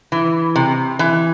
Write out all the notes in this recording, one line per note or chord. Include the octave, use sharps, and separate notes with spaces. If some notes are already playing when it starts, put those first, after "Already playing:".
E3
C3
E3